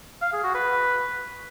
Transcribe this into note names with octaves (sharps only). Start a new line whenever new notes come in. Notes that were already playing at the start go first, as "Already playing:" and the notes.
F5
G#4
F#4
B4